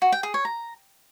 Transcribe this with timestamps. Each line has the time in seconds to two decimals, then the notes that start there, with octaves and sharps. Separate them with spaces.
0.02 F#4
0.12 G5
0.23 G#4
0.34 C#5
0.45 A#5